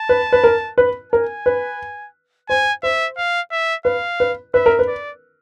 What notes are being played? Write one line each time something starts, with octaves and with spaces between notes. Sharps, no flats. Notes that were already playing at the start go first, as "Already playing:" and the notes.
Already playing: A5
B4
B4
A#4
B4
A#4 G#5
B4
C5 G#5
C5 E5
F5
E5
B4 F5
B4
B4 E5
A#4
B4
D5